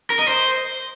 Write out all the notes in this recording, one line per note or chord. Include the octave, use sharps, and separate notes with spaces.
A#4
D#5
C5